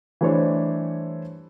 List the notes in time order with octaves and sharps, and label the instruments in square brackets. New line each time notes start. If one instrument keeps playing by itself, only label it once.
[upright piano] E3 G3 A3 D4 C5 C#5